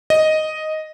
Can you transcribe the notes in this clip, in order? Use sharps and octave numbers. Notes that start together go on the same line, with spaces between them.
D#5